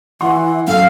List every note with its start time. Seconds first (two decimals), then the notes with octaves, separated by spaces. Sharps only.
0.21 E3 F#5 C6
0.67 F#2 A4 F5